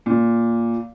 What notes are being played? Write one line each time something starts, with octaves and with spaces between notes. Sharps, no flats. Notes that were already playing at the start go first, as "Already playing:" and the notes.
A#2